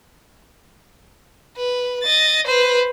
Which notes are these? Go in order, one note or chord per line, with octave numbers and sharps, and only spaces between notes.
B4
D#5 A6
B4 C5